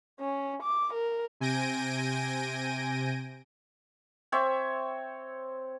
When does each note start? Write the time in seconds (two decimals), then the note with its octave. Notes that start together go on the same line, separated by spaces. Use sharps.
0.20 C#4
0.63 D6
0.93 A#4
1.40 C3 G#5 G6 A#6 D7 D#7
4.32 C4 C#5 E5 E6